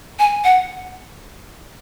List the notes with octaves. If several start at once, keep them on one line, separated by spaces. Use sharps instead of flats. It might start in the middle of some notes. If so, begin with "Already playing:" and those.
G#5
F#5